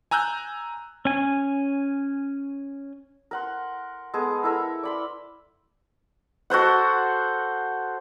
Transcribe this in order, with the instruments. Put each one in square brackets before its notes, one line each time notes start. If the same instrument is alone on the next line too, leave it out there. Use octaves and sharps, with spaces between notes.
[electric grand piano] G#5 A#5 E6 F#6 G6
[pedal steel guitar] C#4 G#5
[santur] A#4 F#5 C6
G#3 B3 G#4 A4
E4 A4 A#4 E5
D5 B5 C6
[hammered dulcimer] F#4 A4 C5 F#5